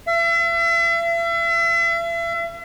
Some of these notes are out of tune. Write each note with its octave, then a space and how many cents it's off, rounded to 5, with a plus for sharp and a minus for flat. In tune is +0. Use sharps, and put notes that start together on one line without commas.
E5 +40